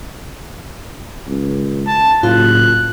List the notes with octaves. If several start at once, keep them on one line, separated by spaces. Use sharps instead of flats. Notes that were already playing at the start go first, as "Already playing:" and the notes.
C#2
A5
F#1 A2 F4 F#6